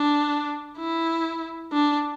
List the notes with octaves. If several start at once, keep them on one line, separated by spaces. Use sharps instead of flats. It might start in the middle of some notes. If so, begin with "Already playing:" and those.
Already playing: D4
E4
D4